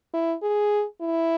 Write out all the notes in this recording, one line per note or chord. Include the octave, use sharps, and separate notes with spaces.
E4
G#4
E4